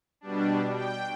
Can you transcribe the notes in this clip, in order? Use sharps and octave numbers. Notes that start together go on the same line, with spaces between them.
B2 G3 D4
G5